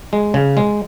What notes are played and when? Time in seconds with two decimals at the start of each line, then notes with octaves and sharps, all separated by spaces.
0.13 G#3
0.34 C#3
0.57 G#3